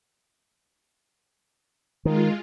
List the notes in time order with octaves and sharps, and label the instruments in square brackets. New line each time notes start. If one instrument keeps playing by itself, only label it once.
[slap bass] D#3 [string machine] G#3 F4